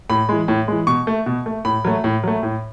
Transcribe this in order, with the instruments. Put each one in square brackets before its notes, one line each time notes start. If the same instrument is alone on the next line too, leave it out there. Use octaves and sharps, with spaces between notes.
[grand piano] A2 B5
E3 G#3
A2
E3 G#3
B2 C#6
A3
B2
A3
A2 B5
F#3 A3
A2
F#3 A3
A2